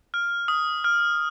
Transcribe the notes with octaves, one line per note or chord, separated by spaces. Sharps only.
F6
D#6
F6